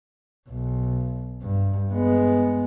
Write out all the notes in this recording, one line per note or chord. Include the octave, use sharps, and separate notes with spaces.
B1
G2
G#3 B3